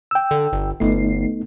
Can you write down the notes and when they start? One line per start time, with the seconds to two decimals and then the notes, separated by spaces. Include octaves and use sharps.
0.11 G5 E6
0.31 D3
0.52 G1
0.80 G1 A3 B3 D#4 C7